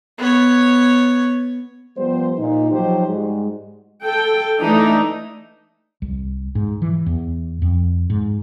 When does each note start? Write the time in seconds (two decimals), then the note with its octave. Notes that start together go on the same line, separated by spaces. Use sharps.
0.18 B3 C#5
1.97 F3 G3 B3 C5
2.38 A#2 D#4
2.72 F3 F#3 D#4 G4 C5
3.07 G#2 G3 G#3 F#4
4.04 A4 G5
4.60 E3 A3 D4 D#4
6.02 C2
6.55 G#2
6.82 E3
7.06 E2
7.62 F2
8.10 G#2